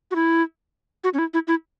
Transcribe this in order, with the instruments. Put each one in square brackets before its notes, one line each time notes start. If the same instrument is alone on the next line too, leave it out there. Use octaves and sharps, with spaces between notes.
[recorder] F#4
E4
F#4
C#4
E4
E4
E4